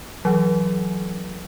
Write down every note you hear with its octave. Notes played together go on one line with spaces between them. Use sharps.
E3 F#3